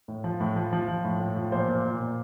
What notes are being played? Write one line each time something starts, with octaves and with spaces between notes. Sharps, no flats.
A2
F3
A2
F3
F3
F3
A2
A2
F3
A#2 C5
A#2
A#2
A#2